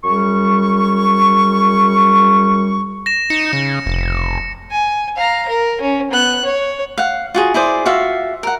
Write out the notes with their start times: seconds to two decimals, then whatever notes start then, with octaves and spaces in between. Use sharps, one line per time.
0.04 F#2 G3 G#4 C#6
3.06 A#6 E7
3.30 D#4 C#7 E7
3.53 C#3
3.86 F1
4.71 G#5
5.16 F5 A#5
5.48 A#4
5.81 C#4
6.11 B3 F#6
6.44 C#5
6.98 F5 F#5
7.34 F4 F#4 G#4
7.54 E4 G#4 C5 D5
7.85 F4 F#4 E5 F5
8.43 A#4 F#5